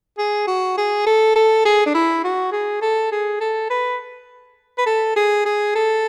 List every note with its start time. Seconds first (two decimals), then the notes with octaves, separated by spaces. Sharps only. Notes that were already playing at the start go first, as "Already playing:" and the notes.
0.18 G#4
0.47 F#4
0.78 G#4
1.06 A4
1.36 A4
1.65 G#4
1.86 D4
1.94 E4
2.24 F#4
2.52 G#4
2.82 A4
3.12 G#4
3.41 A4
3.70 B4
4.78 B4
4.86 A4
5.16 G#4
5.45 G#4
5.75 A4